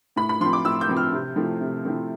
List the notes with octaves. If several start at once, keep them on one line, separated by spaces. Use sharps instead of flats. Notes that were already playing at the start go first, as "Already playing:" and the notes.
A2 B5
B5
F3 C4 C6
D6
A2 E6
G6
F3 C4
F6
C3
F3 A3 C4 E4
C3
F3 A3 C4 E4